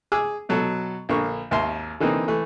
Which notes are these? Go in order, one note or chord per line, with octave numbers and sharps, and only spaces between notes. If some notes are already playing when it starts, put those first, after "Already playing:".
G#4 G#5 D6 E6
B2 F#3 A4
A#1 D3 A#3 C#6
G#1 D#2 A#4 E5 C6
D3 E3 A#3 C4 D#4
E3 A3